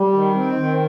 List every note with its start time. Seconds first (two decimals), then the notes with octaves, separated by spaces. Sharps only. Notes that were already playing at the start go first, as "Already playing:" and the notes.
Already playing: G3
0.13 D#3
0.34 C4
0.56 D#3